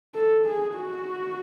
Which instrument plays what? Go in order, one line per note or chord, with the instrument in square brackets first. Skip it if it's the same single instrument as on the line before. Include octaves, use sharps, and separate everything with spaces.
[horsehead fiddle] A4
G#4
F#4